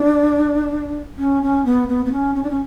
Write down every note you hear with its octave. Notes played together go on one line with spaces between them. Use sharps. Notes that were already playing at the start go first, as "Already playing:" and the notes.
Already playing: D4
C#4
C#4
B3
B3
B3
C#4
C#4
D4
C#4